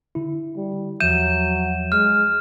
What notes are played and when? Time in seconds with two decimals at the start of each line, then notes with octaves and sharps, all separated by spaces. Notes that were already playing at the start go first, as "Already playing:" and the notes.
0.15 D3 E4
0.57 G3
1.00 E2 F3 F#3 E5 G6 D#7 E7
1.92 G#3 F6